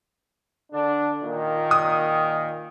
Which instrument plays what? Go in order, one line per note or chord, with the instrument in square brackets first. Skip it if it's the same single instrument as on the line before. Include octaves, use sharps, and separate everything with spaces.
[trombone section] D3 D4
A#2 D#3
[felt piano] D#6